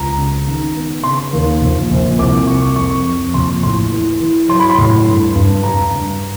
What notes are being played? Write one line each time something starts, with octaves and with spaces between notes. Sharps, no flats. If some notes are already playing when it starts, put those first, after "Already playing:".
Already playing: C#2 A#5
C#3
D#3
B3
C#3 C6
D#2
A#1
A#1
C2 D6
C3 C#6
F2 C#6
F2
A#1 C6
A2 C6
E3
E3
F#3 C6
B5
C6
A2
G2
G2
G2 A#5
G2